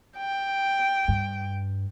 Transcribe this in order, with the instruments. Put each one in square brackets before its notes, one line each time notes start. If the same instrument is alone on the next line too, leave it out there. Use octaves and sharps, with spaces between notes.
[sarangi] G5
[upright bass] G2